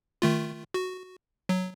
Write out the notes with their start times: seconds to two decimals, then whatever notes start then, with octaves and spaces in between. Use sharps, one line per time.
0.22 D#3 A3 F4
0.74 F#4
1.49 F#3